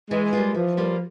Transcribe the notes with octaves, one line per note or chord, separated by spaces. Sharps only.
E3 G#3
G3 A#3 F4
E3 F3
G3 A#3 F4